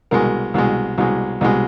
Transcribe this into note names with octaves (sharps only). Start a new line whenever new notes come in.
C2 B2 G#3 A#4
C2 B2 G#3
C2 B2 G#3
C2 B2 G#3